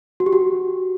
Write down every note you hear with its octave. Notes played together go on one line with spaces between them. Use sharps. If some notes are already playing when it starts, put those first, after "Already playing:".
F#4
G4
F#4